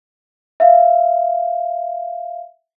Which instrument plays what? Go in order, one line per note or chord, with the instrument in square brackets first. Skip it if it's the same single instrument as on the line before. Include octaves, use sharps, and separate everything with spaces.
[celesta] E5 F5